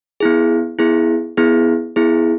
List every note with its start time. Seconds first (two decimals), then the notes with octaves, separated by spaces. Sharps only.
0.20 B3 E4 G#4
0.79 B3 E4 G#4
1.37 B3 E4 G#4
1.96 B3 E4 G#4